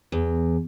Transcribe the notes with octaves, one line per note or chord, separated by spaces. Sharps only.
E2